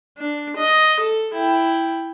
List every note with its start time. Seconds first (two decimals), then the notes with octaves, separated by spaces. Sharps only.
0.18 D4
0.57 D#5
1.00 A4
1.34 E4 G5